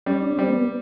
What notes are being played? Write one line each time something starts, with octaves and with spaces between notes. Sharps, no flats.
G3 C#4
D4
C#4
G3 C4
A#3
B3